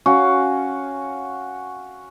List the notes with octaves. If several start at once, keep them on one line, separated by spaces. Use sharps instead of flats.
C#4 F#4 F5